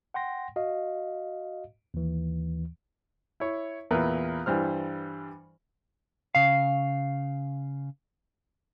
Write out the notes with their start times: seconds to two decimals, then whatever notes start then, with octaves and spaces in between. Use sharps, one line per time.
0.14 F#5 G5 C6 A#6
0.56 F#4 D#5 F5
1.94 D#2 E3
3.40 E4 C#5
3.91 E2 A#2 E4 A#4 B4
4.46 G2 E3 G3 C5 F6
6.35 C#3 F5